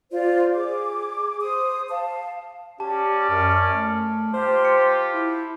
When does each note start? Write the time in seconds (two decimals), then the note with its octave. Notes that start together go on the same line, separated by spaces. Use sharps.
0.11 F4 C5 D5
0.55 G#4 D6
1.41 C5 D#6
1.90 F5 A5
2.80 C#4 G4 D5 A5
3.30 F#2 A5 F6
3.72 A3
4.34 F4 G4 C5
4.65 C#7
5.14 E4